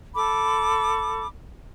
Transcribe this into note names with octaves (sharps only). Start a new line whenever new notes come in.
A4 B5 D6